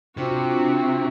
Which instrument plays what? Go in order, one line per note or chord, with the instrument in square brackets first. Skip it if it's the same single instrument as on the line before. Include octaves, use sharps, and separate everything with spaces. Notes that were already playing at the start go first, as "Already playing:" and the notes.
[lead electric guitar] C3 [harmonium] C4 [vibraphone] D4 F4 [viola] F#4